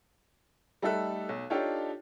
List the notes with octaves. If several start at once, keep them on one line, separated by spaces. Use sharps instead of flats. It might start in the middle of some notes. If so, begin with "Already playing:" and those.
G3 A3 D#4 A4 E5 F#6
B1
D4 D#4 F4 G4 A4 C#5